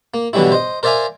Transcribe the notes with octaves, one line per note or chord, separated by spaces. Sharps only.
A#3
B2 D3 E3 F#3 G3 E4
C5 D#5
A#4 C5 D5 E5 F5 G#5